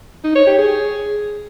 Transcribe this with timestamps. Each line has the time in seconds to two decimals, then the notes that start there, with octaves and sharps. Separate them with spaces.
0.24 D#4
0.35 C#5
0.46 G4
0.58 G#4